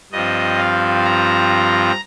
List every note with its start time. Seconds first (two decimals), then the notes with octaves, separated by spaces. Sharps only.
0.12 G2 F3 C4 D#5
0.58 F5
1.04 A#5